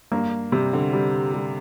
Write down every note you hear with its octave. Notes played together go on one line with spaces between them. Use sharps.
G2 A#3
C3 G3
D3
G3
G3